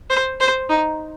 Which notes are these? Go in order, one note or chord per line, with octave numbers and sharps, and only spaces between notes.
C5
C5
D#4